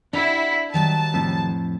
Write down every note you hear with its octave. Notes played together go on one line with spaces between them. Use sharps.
D4 E4 G4 F#5
D#3 F#3 G3 A5
F2 A2